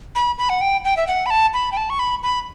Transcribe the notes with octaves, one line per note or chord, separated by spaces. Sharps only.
B5
B5
F#5
G5
G5
E5
F#5
B5
A5
B5
G5
A5
C#6
B5
B5